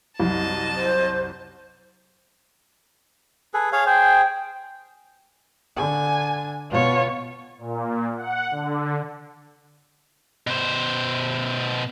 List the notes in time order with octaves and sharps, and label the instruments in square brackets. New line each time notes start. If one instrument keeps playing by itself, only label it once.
[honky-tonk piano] C2 F#2 [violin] D#5 A5
[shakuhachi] C5
[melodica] G#4 A4 B4
G#4 C#5 F5
[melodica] G#4 C5 [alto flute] G5
[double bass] D3 [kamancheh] G#5
[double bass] B2 [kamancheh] F4 C#5
[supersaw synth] A#2
F#5
D3
[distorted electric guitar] B2 C5